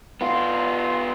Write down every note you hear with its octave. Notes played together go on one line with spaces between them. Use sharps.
B3 F4